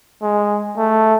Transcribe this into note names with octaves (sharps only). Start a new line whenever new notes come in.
G#3
A3